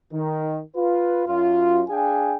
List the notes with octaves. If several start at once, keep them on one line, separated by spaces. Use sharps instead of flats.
D#3
F4 B4
F#2 F4
D4 G#4 F5 G5 G#5